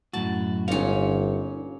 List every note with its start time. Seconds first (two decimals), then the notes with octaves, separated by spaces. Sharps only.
0.13 F#2 A2 F#4 A5
0.68 G1 A#2 C#4 D#4 F5